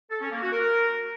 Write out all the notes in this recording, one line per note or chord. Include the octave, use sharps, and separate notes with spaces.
A4
C#4
A#3
F#4
A#4